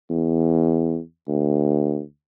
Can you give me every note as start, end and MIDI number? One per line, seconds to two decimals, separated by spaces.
0.10 0.99 40
1.28 2.01 38